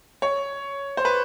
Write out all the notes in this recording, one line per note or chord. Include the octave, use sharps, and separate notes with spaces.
C#5
C5
B4